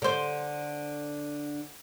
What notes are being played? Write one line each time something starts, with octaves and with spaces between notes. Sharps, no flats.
D3 C5